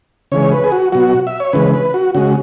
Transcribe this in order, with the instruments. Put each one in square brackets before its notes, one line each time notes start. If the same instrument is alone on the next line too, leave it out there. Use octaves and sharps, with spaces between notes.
[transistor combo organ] C#3 E3 G#3 C#5
B4
G#4
F#4
B2 F#3 F#4
E5
C#5
C#3 E3 G#3 B4
B4
F#4
C#3 G#3 F#4